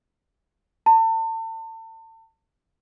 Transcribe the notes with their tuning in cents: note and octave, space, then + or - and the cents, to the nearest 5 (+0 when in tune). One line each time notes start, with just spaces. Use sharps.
A5 +35